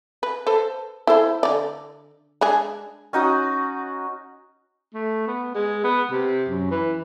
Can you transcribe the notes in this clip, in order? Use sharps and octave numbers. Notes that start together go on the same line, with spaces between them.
B4
A4 B4 C5
E4 A4 C5
D3 D5
G#3 D4 G#4
C#4 D#4 F#4 D#6
A3
B3
G#3
B3
C3
F#2
E3